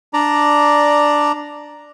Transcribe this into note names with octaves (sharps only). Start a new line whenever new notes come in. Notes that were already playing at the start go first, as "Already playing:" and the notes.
D4 D5 A#5